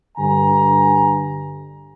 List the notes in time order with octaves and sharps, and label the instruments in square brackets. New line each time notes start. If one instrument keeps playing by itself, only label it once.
[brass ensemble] G2 D3 G#5 A#5